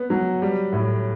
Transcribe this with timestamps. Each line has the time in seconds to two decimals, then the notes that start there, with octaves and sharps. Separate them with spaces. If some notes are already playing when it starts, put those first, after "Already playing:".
Already playing: B3
0.10 F#3
0.42 G3
0.73 A2